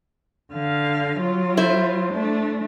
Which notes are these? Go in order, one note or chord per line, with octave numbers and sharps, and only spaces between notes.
D3 F5
F#3 F4
E4 C5
A3 D4